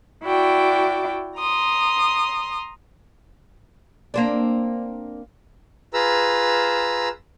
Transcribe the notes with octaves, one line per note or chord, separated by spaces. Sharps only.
E4 F#4 D5 G5
A#5 C6 D#6
A#3 C4 D4
F4 G#4 B4 A#5 E6